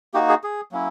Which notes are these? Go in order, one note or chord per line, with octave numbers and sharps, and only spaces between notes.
A#3 D#4 F#4 G4
G#4
G#4
F#3 A#3 C#4 E4